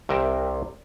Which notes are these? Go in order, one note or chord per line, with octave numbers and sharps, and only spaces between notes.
C2 C3 A#4 E5 G5